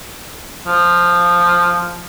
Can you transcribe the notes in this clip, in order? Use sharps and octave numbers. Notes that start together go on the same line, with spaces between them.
F3